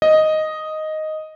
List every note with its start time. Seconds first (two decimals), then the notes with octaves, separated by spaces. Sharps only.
0.02 D#5